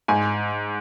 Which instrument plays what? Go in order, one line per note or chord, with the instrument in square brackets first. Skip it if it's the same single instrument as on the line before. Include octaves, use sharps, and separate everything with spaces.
[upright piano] G#2 G#5